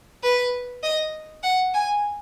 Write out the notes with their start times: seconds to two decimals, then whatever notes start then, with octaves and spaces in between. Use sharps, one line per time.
0.24 B4
0.83 D#5
1.43 F#5
1.74 G#5